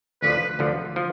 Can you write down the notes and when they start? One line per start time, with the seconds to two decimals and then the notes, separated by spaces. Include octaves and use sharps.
0.22 D2 D3 F3 B4
0.59 D2 D3 F3
0.96 F3